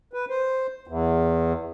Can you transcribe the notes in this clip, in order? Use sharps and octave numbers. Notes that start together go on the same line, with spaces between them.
B4
C5
E2